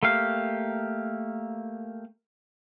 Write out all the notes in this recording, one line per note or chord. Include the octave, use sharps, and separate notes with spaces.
A3 A#3 G4 F5